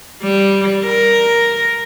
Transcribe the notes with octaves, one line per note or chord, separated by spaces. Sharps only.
G3
A#4